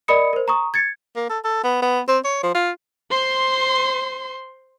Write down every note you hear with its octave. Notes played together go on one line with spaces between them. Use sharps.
A#4 D5 D#5 B5 D#6 C#7
A#4 C5
A#5 C#6 D#6
G#6 A6 C#7
A#3
A4
A4
B3
B3
C4
C#5
F3
F4
C5 C6